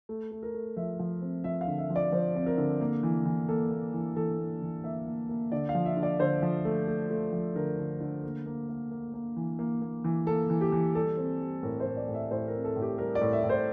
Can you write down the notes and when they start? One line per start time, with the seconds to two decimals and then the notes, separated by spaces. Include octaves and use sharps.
0.09 A3
0.31 A3
0.43 A#4
0.54 A3
0.77 F3 E5
0.99 F3
1.22 C4
1.44 F3 E5
1.61 F5
1.67 D3
1.78 E5
1.90 F3
1.96 D5
2.12 F3 C5
2.35 C4
2.46 A#4
2.58 D3
2.80 A#3
3.03 E3
3.25 E3
3.48 A#3 A4
3.71 A#3
3.94 E3
4.16 E3 A4
4.39 A#3
4.62 E3
4.84 A#3 E5
5.07 A#3
5.29 A#3
5.52 D3 D5
5.69 F5
5.75 F3
5.85 E5
5.97 D3
6.03 D5
6.20 D3 C5
6.42 F3
6.65 A3
6.88 A3
7.10 A3
7.33 F3
7.55 D3 A#4
7.79 D3
8.01 D3
8.24 A#3
8.46 A#3
8.69 A#3
8.91 A#3
9.14 A#3
9.36 E3
9.59 A#3
9.82 A#3
10.04 E3
10.27 A#3 A4
10.50 E3
10.61 G4
10.72 E3
10.95 G3 A4
11.17 C4
11.40 G3
11.63 A2 A#4
11.80 C5
11.85 A2
11.97 D5
12.08 A2
12.14 E5
12.31 A2 C5
12.48 A#4
12.53 C4
12.64 A4
12.76 A2
12.82 G4
12.98 G3 A#4
13.15 D5
13.21 A2
13.33 E5
13.44 A2
13.49 C5